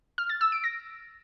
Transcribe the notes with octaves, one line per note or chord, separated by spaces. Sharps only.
F6
A6
E6
D7
A#6